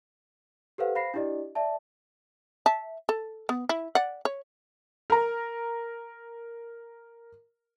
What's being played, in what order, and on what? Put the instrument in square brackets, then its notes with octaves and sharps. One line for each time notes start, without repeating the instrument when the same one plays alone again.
[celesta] G4 A4 B4 C5 F5 F#5
C5 F5 B5 A#6 C7
D4 E4 G4 D5 D#5
D5 E5 A5
[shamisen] E5 A5
A4
B3
E4
D5 F#5
C#5
[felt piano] A#4 A#5